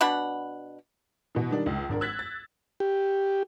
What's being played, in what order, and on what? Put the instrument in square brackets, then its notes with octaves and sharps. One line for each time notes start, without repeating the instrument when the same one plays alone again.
[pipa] B2 D4 F#5 B5
[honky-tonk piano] B2 E3
D#3 G3 D4
C#2
G#1 D4 A#4
E6 F#6 G#6 A6 B6
A6
[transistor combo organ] G4